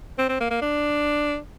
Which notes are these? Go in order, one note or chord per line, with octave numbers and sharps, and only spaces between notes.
C4
C4
A#3
A#3
D4